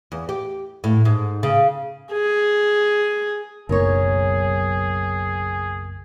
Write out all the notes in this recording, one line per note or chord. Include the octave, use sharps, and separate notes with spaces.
E2
G4
A2
G#2
C#3
G#4
F#1 B1 G#4 A#4 C#5